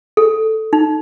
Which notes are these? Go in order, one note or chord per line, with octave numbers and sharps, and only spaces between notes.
A4
D#4